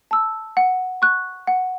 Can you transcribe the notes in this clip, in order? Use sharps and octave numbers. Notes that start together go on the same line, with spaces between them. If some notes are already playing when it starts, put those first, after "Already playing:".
A5 E6
F#5
C#6 F#6
F#5